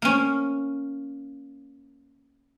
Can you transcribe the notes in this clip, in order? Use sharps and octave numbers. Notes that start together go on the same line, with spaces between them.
A#3 C#4